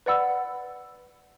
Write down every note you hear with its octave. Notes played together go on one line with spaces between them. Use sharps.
B4 D5 F#5 B5 E6